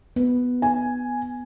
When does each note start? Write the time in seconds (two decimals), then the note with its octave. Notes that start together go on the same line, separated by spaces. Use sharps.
0.16 B3
0.62 G#5